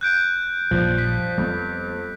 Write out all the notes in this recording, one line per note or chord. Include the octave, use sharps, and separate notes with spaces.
F#6 G6 D7
A#1 F#2 F3 G3
B6
F2 G3 B3